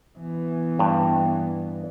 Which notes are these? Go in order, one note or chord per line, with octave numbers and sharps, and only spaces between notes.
E3 B3
G2